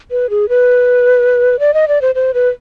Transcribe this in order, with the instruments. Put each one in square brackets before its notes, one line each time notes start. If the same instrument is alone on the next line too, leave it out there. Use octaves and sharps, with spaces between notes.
[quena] B4
G#4
B4
D5
D#5
D5
C5
C5
B4